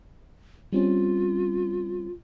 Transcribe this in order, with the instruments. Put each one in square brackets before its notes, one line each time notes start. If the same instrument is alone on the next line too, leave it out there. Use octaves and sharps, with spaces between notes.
[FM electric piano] G3 C4 C#4 [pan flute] F4